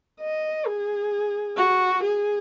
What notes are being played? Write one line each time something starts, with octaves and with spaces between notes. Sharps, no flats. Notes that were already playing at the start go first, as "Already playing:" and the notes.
D#5
G#4
F#4
G#4